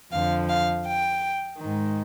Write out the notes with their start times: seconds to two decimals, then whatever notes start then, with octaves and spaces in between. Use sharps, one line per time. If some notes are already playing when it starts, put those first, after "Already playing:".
0.12 F2 D3 F3 F5
0.49 F5
0.86 G5
1.58 G#2 D#3